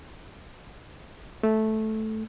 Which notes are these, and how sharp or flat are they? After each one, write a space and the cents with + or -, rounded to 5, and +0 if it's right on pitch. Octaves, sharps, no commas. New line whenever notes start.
A3 -10